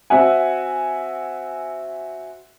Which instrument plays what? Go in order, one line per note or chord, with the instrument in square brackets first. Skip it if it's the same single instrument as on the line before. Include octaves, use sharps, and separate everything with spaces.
[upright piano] C4 F#4 E5 F#5 G#5